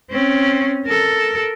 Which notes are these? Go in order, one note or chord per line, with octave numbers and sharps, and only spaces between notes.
C4 C#4
A4 A#4